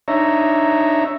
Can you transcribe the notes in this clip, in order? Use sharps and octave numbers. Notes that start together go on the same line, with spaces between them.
D4 D#4 C#5 E5 A#5